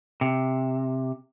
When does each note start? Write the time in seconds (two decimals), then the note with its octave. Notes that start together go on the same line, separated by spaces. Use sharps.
0.21 C3